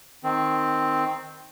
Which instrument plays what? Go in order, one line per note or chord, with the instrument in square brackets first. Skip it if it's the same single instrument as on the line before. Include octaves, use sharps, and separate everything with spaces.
[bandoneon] D#3 C4